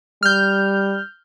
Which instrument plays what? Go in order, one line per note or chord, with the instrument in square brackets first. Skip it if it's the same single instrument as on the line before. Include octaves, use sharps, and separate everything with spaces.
[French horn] G3 [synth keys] F6 G6